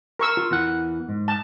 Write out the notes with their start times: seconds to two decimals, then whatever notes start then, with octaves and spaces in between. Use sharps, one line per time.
0.19 A#4 C#6 E6
0.37 F4
0.51 E2 E3 F#5
1.09 G#2
1.28 A5